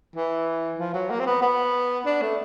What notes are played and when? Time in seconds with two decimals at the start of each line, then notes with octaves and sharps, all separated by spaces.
0.16 E3
0.79 F3
0.94 F#3
1.10 A#3
1.20 C4
1.26 B3
1.42 B3
2.06 D4
2.22 A3